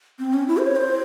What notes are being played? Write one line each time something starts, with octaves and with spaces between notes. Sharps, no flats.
C4
C#4
E4
C5
C#5
C5